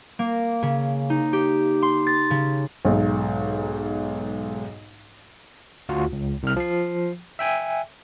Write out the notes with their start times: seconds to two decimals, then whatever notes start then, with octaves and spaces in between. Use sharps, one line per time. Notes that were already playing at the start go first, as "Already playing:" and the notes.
0.19 A#3
0.63 C#3
1.10 D#4
1.33 G4
1.82 C6
2.07 A6
2.30 C#3
2.85 B1 G#2
5.89 D2 F4 F#4
6.12 C#2
6.43 C2 F6
6.56 F3 C7
7.39 E5 G5 G#5